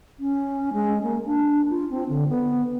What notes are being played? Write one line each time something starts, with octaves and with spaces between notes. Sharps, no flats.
C#4
G#3
A#3
D4
F4
C4
D3
B3